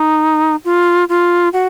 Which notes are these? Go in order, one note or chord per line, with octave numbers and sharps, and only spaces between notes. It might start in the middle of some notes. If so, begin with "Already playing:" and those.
Already playing: D#4
F4
F4
F#4